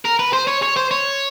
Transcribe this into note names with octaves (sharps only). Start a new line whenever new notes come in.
A#4
B4
C5
C#5
C#5
C5
C#5